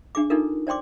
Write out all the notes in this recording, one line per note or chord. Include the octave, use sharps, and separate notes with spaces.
D4 G#4 D6
D4 D#4 F4 A4 A#4
C5 D5 G5 C6 D6